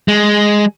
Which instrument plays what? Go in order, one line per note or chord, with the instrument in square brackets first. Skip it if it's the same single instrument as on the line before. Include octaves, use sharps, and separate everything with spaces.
[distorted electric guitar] G#3